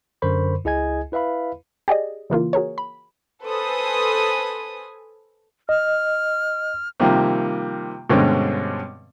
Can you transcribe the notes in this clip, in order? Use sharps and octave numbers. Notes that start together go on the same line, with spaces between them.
F#2 D3 A#4 C5 B5 C#6
C#2 E4 G#4 D#5 G#5 G#6
E4 B4 E5 F5 B5
G4 G#4 D5 D#5
C#3 E3 A#3 F4
F#4 G#4 A#4 C#5
B5
A4 B4 C5 G#5 D#6
D#5 F6
C3 D#3 F3 G3 A#3
G2 B2 D3 G#3 C4 C#4